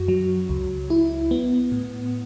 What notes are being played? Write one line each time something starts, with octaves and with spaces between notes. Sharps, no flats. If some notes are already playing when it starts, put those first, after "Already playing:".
Already playing: F#2 F#4
F#3
C#2
E4
B3
A2